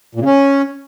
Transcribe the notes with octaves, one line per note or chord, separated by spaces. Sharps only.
A#2
C#3
C#4